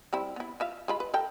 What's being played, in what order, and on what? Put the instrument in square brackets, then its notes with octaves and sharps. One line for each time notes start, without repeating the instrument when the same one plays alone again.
[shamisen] G3 C4 E4
B3 E4
F4 E5 F5
G#3 F4 B5
B4
A4 A#4 G5